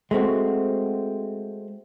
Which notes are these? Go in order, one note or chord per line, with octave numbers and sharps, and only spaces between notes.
G#3 A3 C4 F#4